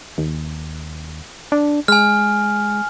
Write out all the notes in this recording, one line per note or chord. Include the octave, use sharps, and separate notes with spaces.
D#2
D4
G#3 G#5 F6